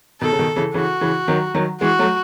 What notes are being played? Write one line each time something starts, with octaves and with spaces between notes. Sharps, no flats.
B2 D#3 A4
C#3
B2 D#3
C#3 E3
C#3 E3 F#4
C#3 E3
D#3 F#3
D#3 F#3
E3 G#3 F#4
F#3 A3